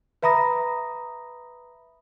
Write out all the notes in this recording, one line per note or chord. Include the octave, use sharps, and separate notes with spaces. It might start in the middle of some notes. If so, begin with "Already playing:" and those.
B4 E5 A#5 B5 D#6 A#6